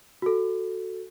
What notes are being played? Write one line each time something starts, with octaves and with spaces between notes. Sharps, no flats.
F#4 A4